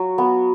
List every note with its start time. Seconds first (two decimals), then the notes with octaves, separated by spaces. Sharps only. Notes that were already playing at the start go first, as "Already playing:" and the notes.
Already playing: F#3 F#4
0.18 B3